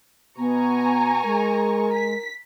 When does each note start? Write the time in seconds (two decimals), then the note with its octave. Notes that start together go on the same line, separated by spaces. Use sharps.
0.38 B2 B3 G#5 A#5 C#6
1.24 G#3 A#4
1.93 B6